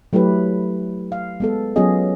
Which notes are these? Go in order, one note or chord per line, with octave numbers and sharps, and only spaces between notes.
F#3 A3 E4 G4 B4
F5
G#3 B3 A4
F#3 B3 C#4 F4 G#4 D#5